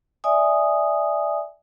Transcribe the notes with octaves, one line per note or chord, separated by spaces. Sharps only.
D5 E5 G#5 D#6